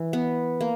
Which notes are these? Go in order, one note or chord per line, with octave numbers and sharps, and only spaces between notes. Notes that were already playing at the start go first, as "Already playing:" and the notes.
Already playing: E3
B3
A#3